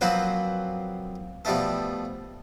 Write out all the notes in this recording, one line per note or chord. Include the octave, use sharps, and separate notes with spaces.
F3 F#3 A#3 C4 B4 C5
B2 F3 G3 A3 A4